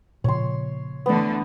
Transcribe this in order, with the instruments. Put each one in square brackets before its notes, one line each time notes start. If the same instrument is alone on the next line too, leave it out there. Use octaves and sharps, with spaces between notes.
[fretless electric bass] A#2 C#3 F3 [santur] C#5 C6
[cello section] D3 E3 A3 [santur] B3 D4